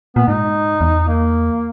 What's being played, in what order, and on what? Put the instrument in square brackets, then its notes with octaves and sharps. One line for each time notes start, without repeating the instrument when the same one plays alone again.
[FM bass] A#2 [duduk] B3
[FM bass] G#2 [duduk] D#4
[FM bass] E2
[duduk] A#3